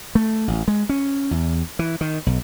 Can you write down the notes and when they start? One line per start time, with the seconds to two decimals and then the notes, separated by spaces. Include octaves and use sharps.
0.15 A3
0.48 A1
0.68 G#3
0.89 C#4
1.31 E2
1.79 E3
2.01 D#3
2.26 B1